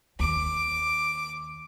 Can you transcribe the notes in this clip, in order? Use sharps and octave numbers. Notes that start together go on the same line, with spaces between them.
D#2 D6